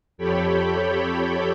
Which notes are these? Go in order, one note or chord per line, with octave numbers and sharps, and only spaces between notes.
F2 G4 A4 C#5 G5 B5